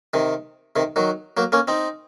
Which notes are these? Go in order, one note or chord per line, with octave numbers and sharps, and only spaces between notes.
C3 D#3
C3 D#3
D#3 F#3
F#3 A#3
A#3 C#4
C4 D#4